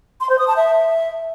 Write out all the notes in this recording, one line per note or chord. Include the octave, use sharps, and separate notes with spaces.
C6
C5
D#6
A5
E5